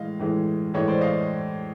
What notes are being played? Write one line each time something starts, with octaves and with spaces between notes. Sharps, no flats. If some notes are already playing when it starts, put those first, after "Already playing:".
Already playing: A2 E3 G#3 D#5 F5
A2 E3 G#3
A2 E3 G#3 C#5 D#5
C5 D5
D#5 F5